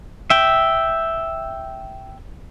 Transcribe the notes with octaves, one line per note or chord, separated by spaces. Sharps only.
E5 G5